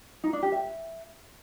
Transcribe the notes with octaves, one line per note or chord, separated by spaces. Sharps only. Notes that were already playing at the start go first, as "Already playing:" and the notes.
D#4
D4
G4
E5